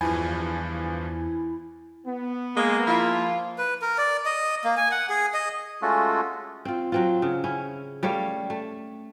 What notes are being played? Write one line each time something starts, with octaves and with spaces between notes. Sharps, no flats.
E2 G2 E3 F3 E4 G#5
B3
G#3 A#3
F3 E4 F4
B4
A#4
D5
D#5
A#3
G#5
F#5
G#4
D#5
G#3 A3 C#4 F4 F#4 A4
C4 F4
F#3 C4 F4
C#3
C#4 E4
G3 A3 C#5 F5
A3